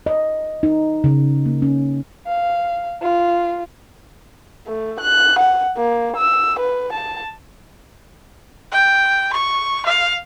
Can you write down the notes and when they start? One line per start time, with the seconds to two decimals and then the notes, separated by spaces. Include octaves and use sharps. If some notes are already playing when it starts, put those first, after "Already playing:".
0.06 D#5
0.63 D#4
1.04 C#3
1.46 A#3
1.62 C#4
2.27 F5
3.02 F4
4.67 A3
5.00 F#6
5.39 F#5
5.77 A#3
6.17 E6
6.60 B4
6.93 A5
8.72 G5
9.33 C#6
9.86 F5